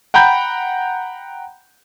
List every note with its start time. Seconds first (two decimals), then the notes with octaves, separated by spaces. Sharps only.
0.14 F#5 G5 A#5 B5 G6